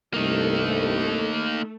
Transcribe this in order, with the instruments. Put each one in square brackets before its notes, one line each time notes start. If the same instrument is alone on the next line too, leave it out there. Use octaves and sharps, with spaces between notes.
[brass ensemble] C2 G2 [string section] A3 [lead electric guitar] A#3 D#4